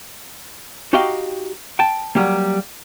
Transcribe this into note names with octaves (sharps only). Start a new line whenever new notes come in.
D#4 F#4 G4 D#5 F5 G5
G5 A5
F#3 G3 A#3